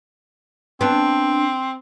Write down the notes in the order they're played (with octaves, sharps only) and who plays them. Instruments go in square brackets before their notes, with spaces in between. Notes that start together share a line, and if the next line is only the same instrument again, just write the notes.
[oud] B3 D4 [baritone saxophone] C4